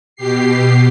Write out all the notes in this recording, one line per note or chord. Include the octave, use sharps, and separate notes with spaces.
B2 G4 C7